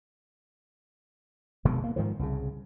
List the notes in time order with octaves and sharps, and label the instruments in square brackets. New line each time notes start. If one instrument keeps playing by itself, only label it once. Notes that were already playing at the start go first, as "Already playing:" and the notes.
[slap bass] F1 B2 D#3 G#3
A#3
G#2 D#3 F3
C2 C#3